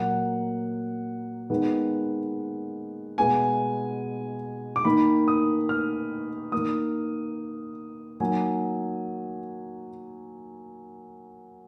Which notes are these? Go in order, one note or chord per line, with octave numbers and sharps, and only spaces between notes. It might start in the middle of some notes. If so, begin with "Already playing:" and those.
Already playing: A#2 F#3 A#3 F#5
D#3 G#3 B3
B2 G#3 B3 G#5
D6
D#3 A#3 B5
D#6
F6
D#3 A#3 D#6
D#3 F#3 A#3 G#5